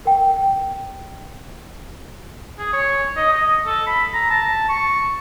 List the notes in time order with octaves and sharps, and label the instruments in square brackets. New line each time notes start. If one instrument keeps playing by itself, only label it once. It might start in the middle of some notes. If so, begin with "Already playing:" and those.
[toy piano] A#4 G5
[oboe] G#4
C#5
D#5
D#5
A4
B5
A#5
A5
C#6